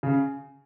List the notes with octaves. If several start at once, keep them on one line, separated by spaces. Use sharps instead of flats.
C#3